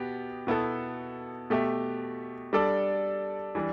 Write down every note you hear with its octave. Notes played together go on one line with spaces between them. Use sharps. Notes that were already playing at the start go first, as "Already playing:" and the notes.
Already playing: B2 B3 G4
B2 B3 E4 A4
B2 A3 G4 E5
G3 D4 A4 D5
E3 G3 D4